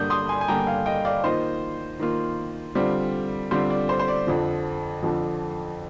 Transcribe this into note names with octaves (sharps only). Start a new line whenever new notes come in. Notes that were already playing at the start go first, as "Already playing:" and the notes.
Already playing: G2 D3 G3 A#3 D4 D#6 G6
C6 D#6
G#5 C6
G#5
G2 D3 G3 A#3 D4 G5 A#5
F5 G#5
D#5 G5
D5 F5
D#3 A#3 F4 C5 D#5
D#3 A#3 F4
D3 G3 C4 F4
D3 G3 C4 F4 C5
D5
C5
C5
D5
F2 D3 F3
F2 D3 F3